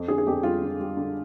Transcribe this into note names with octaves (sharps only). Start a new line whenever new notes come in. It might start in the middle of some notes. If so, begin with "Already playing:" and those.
Already playing: F2
D3 G#4
G#4
F2 G4
G3 F4
D3
G3
D3